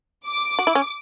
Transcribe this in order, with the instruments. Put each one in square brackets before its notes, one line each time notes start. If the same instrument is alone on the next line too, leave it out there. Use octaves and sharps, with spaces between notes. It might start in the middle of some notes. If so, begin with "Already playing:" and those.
[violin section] D6
[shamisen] F#4
E4
C#4